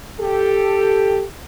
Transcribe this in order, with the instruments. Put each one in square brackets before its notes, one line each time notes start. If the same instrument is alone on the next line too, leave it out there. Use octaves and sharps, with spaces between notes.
[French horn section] G4 A4